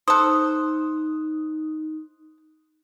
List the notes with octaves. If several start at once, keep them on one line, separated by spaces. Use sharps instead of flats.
D#4 A4 C5 D#6 F#6